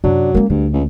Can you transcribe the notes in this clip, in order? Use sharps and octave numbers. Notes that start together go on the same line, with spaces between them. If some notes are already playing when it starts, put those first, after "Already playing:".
F#2 C3 F#3 D4
G#3 A#3 C#4
D2 G2 A3
C#2